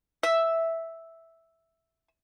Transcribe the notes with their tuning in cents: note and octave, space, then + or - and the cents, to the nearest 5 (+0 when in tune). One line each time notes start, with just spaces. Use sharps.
E5 -5